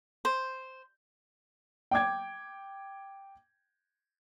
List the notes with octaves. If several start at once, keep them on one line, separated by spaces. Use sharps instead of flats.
C5
G5 D6 G#6